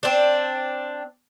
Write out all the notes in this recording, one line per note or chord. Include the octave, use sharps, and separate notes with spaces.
C4 D4